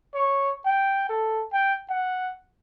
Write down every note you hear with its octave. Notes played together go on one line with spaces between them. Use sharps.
C#5
G5
A4
G5
F#5